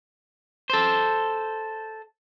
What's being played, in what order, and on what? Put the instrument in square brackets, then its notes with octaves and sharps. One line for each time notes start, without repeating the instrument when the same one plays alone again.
[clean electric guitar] A4 C5